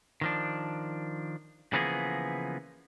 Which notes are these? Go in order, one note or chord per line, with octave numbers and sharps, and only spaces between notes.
D#3 F3 D4
C#3 E3 F3 A#3 B3 G#4